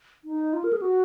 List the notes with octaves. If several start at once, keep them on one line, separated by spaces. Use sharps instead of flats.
D#4
F4
A#4
G#4
F#4